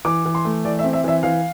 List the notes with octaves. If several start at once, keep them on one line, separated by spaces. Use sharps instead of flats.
E3 D6
E3
C6
A3
E3 D5
E5
C4
E5
E3 E5
E3 F5